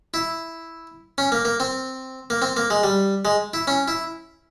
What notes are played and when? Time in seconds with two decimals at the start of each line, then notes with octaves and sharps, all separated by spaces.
0.14 E4
1.18 C#4
1.32 A#3
1.45 A#3
1.60 C4
2.30 A#3
2.42 C4
2.57 A#3
2.70 G#3
2.83 G3
3.25 G#3
3.54 E4
3.67 C#4
3.88 E4